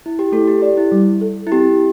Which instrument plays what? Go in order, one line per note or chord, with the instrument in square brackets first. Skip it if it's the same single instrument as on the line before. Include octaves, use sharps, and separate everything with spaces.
[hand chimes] E4
G4
[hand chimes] A3 A4 [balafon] E4
[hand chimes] G4
[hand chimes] G4 [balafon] D5
[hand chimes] E4
[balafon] G3
A4
[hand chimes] E4
[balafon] C4 [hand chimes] G4